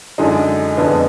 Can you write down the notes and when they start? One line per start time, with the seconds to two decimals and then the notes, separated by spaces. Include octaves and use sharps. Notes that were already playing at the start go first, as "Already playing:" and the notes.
0.18 F#2 D3 G#3 D#4
0.77 F2 D3 G#3 B3